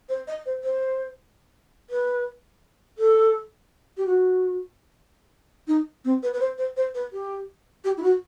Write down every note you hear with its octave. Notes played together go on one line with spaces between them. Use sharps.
C5
D#5
C5
C5
B4
A4
G4
F#4
D#4
C4
B4
B4
C5
C5
C5
B4
G4
G4
E4
F#4